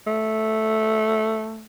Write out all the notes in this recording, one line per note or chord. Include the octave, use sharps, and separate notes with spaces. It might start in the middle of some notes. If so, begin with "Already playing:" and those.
A3